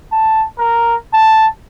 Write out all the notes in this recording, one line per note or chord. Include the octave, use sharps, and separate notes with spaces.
A5
A#4
A5